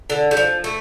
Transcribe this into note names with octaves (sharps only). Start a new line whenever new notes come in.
D3
G3
F3
A3